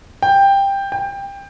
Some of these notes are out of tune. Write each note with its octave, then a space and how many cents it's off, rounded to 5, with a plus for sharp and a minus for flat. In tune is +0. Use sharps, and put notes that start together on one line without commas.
G5 +10
G5 +20